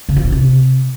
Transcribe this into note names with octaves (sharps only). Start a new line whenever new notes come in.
C#3
F3
B2
C3